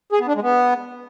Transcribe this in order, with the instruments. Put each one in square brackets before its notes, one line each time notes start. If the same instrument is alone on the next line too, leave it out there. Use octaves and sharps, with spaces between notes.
[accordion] G#4
B3
D4
G#3
B3